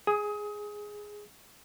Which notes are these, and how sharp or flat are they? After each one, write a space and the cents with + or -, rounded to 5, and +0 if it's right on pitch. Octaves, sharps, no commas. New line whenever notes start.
G#4 +0 D#6 +25